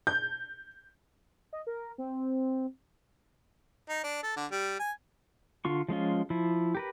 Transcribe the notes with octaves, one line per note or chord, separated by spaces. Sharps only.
G6
D#5
A#4
C4
D#4
D4
A4
D3
G3
G#5
D3 F4 C#6
F3 G#3 C#4 F4
F3 E4
G4 A#4 B4